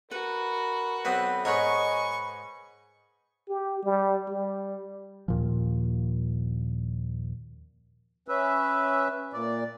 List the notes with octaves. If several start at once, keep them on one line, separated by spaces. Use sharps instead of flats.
F#4 A#4 B4
B1 B3 C4 B4
G#2 A#4 B4 C#5 D#5 G#5 C#6 D#6
G4
G3
G3
D#2 A#2 F3
C#4 B4 E5
A#2 D5